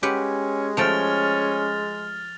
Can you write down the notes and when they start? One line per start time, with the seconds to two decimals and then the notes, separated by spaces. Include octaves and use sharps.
0.03 G#3 C#4 G4 B4 F#5
0.77 F3 A3 C#4 G5 F6 A6 F7